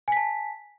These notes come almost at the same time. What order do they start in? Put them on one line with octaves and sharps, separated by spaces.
G#5 B6 A5